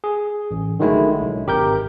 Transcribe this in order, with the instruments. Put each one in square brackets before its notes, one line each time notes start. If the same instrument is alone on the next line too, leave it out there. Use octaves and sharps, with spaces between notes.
[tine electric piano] G#4
A1
D3 D#3 F#3 G#3 A3 E4
B1
G#1 G4 A#4 G6